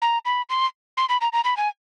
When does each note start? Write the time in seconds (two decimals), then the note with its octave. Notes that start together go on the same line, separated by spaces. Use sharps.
0.02 A#5
0.25 B5
0.50 C6
0.97 C6
1.09 B5
1.21 A#5
1.33 A#5
1.44 B5
1.57 G#5